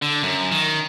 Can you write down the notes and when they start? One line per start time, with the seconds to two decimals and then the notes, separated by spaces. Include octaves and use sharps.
0.02 D3
0.23 F#2
0.51 D#3